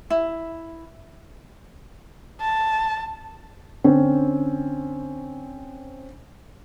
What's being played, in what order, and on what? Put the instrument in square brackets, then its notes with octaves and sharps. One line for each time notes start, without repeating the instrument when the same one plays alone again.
[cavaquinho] E4
[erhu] A5
[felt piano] D3 C4 C#4